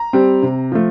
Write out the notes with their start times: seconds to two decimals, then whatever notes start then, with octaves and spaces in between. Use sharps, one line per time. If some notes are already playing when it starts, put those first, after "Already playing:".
Already playing: A#5
0.13 G3 C4
0.43 C3
0.72 F3 A3